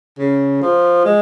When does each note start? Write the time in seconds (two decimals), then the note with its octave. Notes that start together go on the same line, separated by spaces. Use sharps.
0.19 C#3
0.62 F3
1.05 G#3